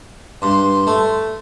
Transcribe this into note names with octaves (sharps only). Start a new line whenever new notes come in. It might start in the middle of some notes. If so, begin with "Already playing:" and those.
G2 C6
A3